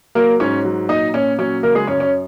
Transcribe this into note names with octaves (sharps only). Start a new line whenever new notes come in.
F#3 A#3 A#4
G#2 C#4 C#5
F#3
A#2 D#4 D#5
A#2 C#4 C#5
F#3 C#4 C#5
C#3 A#3 A#4
G#3 G#4
F#2 C#4 C#5
C#4 C#5